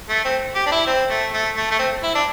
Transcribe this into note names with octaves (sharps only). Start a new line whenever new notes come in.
A3
C4
G4
D4
E4
C4
A3
A3
A3
A3
C4
E4
D4